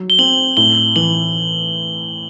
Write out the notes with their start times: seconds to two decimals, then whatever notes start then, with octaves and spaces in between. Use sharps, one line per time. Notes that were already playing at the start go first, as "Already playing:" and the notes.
Already playing: F#3
0.10 G7
0.18 C4 F#7
0.57 A2 G7
0.96 E3 F#7